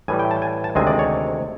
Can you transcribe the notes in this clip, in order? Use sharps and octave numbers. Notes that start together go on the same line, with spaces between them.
A2 E3 G3 G#5
G5
A5
G#5
A5
D2 C3 D#3 G#3 C4 G#5
D5
C#5